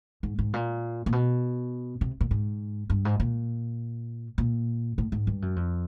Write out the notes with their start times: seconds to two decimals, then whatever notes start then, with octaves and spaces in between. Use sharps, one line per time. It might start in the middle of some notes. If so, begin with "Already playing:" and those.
0.23 G#2
0.39 G#2
0.53 A#2
1.06 A#2
1.12 B2
2.01 C3
2.21 A#2
2.31 G#2
2.90 G2
3.05 G#2
3.20 A#2
4.38 A#2
4.98 A2
5.12 G#2
5.27 G2
5.42 F#2
5.56 F2